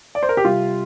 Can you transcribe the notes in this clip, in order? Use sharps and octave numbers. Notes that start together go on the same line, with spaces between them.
D5
C5
A#4
G4
C3 G3 C4 F4